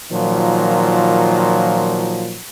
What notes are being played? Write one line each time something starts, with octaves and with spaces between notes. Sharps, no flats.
A#2 D#3 F3 F#3